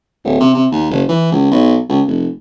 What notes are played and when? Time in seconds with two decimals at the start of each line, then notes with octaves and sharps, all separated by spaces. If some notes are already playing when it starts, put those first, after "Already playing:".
0.25 D1
0.40 C3
0.54 C3
0.72 D#2
0.91 F#1
1.09 E3
1.32 C#2
1.51 B1
1.89 C#2
2.07 F1